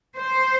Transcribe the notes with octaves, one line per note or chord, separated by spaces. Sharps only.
C5